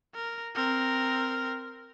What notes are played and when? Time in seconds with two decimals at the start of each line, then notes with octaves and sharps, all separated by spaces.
0.14 A#4
0.55 C4 A#4